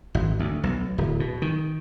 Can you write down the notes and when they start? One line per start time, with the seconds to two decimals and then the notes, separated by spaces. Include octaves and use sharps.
0.15 G#1
0.39 D2
0.63 B1
0.98 D1
1.20 B2
1.42 D#3